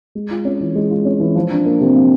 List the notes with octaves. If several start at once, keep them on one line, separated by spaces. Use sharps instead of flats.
G#3
F4
C#4
E3
G#3
F4
C#4
E3
F3
D4
A#3
C3
F3